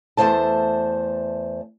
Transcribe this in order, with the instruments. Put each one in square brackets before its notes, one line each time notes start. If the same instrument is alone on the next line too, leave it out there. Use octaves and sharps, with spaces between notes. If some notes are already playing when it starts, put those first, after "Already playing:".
[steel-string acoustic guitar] E2 C#3 A3 C5 A5